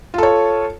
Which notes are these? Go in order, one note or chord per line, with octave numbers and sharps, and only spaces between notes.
F4 A4 C#5